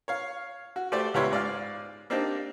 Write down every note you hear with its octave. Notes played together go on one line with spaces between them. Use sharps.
C#5 F5
F#4
A3 G4 C5 D5
C#2 B3 G4 C#5 E5 C6
G#2 D5 F5 F6
A#3 C4 D4 D#4 G4